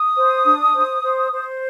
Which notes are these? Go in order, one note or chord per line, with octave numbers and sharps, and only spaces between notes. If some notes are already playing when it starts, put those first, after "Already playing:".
Already playing: D#6
C5
D4
C5
C5
C5